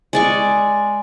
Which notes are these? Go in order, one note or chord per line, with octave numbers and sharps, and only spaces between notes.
G#3 D5 C#6